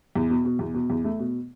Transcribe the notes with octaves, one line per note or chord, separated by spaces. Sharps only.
E2
B2
B2
E2
B2
E2
A3
B2